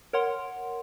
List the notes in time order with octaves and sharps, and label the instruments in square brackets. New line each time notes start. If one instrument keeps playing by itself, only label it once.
[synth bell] A#4 C#5 F#5 C6